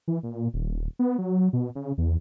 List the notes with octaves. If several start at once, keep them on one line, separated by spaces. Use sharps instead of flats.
E3
A#2
D#1
B3
F#3
B2
C#3
E2